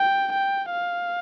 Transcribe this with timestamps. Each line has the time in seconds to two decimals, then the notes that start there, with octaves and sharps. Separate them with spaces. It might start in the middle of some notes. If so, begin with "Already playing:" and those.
Already playing: G5
0.32 G5
0.72 F5